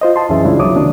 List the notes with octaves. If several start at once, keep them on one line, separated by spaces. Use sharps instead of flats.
F4 C5 D#5
A5 C6
C2 F#2 E3 C#4 G#4 E5
C#3 G3 G#3 D4 E4 F4
C2 F#3 C#5 D6 D#6
C3 D#3 A#3 D4